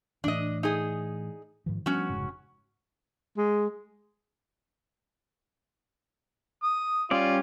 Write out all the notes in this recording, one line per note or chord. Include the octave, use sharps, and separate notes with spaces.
A2 E3 D4 D#5
D#4 G#4
G#2 D#3 F3
F3 G3 B3 C#4 F#4
F1 G#2 C#3
G#3
D#6
G3 C#4 F4 D5